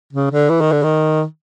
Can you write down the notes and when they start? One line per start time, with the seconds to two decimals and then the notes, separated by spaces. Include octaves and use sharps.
0.13 C#3
0.31 D3
0.50 E3
0.61 D#3
0.72 D3
0.83 D#3